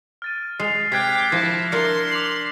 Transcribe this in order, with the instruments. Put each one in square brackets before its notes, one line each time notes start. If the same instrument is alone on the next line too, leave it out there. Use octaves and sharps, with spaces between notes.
[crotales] F6 A6 D#7
[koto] G#3 [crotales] C7 F7
[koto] C3 [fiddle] G5 D6 [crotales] F#6 G#6 B6
[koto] F3 [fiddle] E4 [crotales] F6 A#6 B6
[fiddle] D4 C6 [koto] A#4 D5 [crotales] C#7
[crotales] D6 F7 F#7